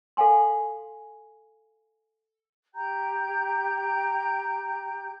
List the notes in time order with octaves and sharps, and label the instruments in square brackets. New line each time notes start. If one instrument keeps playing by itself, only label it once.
[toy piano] A4 F5 F#5 G#5 C6
[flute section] G4 G5 A#5 G6